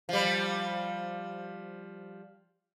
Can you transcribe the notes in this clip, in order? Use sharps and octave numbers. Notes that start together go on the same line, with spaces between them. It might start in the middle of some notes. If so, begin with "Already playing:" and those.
F3 G3